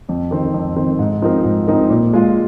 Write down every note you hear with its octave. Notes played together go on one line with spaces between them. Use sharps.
F2
D#3 C4
F2
D#3 C4
G#2
F3 C4 D#4 A#4
G#2
F3 C4 D#4 A#4
A#2
G#3 F4